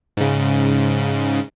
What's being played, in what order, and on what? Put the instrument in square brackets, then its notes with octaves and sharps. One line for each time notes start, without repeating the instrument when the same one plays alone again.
[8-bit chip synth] G#2 C#3